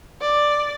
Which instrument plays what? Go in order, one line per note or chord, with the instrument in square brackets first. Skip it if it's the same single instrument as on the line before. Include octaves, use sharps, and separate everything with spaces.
[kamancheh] D5